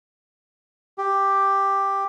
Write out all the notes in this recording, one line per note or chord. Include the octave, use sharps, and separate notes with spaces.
G4